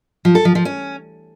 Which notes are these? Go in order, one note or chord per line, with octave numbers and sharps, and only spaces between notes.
F3
A4
F3
F3
C#4